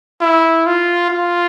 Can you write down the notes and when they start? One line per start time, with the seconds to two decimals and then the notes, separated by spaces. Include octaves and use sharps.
0.21 E4
0.67 F4
1.11 F4